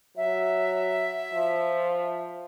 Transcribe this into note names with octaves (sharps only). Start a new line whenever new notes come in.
F#3 E5
F3